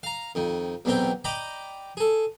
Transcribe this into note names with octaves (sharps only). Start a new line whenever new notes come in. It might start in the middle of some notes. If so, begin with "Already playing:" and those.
F5 A#5
F2 D#3
B1 E2 B2 C4 A#4 G5
D5 D#5 G5 A#5 B5 D6
G#4 A4